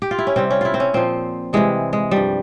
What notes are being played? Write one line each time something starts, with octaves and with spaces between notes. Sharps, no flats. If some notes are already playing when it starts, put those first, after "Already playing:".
G4
F4
E4
C#4
C3 G3 C4
C#4
E4 F4
C4
C#4
A#2 F3 C4
C3 E3 G3 G#3
G#3
G2 F3 G3